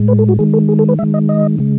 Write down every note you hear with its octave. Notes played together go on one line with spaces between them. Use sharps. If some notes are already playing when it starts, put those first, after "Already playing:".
Already playing: A2 G#3
B4
A4
F#4
D#3 G#3 G#4
A4
G#4
A4
B4
D#3 G#3 E5
D#5
D#5
C#3 G#3